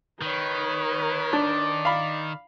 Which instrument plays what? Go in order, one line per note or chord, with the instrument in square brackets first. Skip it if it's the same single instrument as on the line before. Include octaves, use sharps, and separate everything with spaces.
[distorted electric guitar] D#3 [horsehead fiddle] B4 C#5
[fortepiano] D4 [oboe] D5
[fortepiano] F5 B5